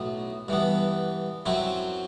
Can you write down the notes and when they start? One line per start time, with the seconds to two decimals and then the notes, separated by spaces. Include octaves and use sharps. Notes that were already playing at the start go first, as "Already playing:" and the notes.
Already playing: B1 A2 F#3 B3
0.48 G2 E3 B3
1.46 F#2 F#3 C4 E4